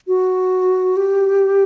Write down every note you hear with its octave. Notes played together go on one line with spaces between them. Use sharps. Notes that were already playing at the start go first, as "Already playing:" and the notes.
F#4
G4